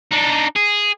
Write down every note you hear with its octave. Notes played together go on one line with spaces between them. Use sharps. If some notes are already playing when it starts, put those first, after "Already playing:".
D4 D#4
G#4